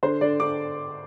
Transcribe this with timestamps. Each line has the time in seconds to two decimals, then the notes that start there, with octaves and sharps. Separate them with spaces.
0.03 D3 C5
0.21 D3 D5
0.40 D3 D6